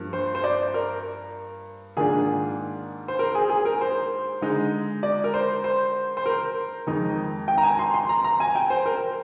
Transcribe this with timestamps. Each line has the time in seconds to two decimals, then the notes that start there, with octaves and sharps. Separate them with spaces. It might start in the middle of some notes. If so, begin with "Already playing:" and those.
Already playing: G2 F3 A#3
0.13 C5
0.35 C5
0.44 D5
0.74 A#4
1.97 G#2 D#3 A#3 D4 F4 G#4
3.08 C5
3.19 A#4
3.35 G#4
3.50 G#4
3.65 A#4
3.81 C5
4.41 D3 G#3 D#4
5.03 D5
5.24 A#4
5.34 C5
5.64 C5
6.17 C5
6.26 A#4
6.87 F2 D#3 G#3 D#4
7.48 G5
7.58 A#5
7.63 G#5
7.79 C6
7.94 C6
8.09 A#5
8.24 A#5
8.40 G#5
8.55 G5
8.70 C5
8.86 A#4